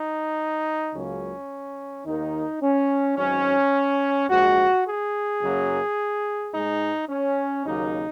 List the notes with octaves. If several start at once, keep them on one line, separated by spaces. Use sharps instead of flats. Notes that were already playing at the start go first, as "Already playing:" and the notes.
Already playing: D#4
C#2 C#3 F#3 A#3 C#4
D#2 D#3 A#3 D#4
C#4
G#1 G#2 F#3 C#4
A#1 G#2 G#3 F#4
G#4
F#2 C#3 F#3 A#3
G#2 G#3 D#4
C#4
D#2 C#3 F#3 A#3 D#4